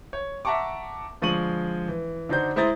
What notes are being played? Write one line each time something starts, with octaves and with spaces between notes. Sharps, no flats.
C#5
E5 F#5 A5 A#5 C#6 D6
D3 F3 G#3 C#6 D#7 F#7
E3
D3 D4 D#4 F#4 C5 G6
G#3 E4 C5 A#5 D#6 A6